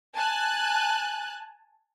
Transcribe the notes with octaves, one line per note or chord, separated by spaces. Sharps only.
G#5 A5 F#6